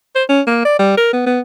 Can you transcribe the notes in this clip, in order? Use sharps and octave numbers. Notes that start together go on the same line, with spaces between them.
C5
C#4
A#3
D5
G3
A#4
B3
B3